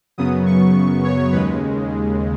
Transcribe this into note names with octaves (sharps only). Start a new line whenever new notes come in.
F#2 C#3 F#3 B3 D#6
C#6
C#5
D#2 C#3 G#3 B4